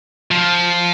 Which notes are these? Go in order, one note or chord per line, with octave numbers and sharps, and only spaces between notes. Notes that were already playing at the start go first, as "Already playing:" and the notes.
F3